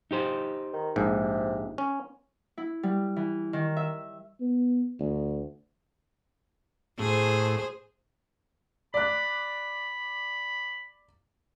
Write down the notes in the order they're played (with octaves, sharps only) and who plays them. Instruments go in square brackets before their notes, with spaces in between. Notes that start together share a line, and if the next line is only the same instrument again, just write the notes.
[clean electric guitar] D#4 G4 C5
[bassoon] D#3
[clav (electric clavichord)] A#1 G#2 [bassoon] C3
[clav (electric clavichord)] C#4
[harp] E4
G3
E3
D#3
E5
[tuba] B3
D2
[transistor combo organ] A2 [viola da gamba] G#4 C5
[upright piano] D5 F#6 [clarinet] B5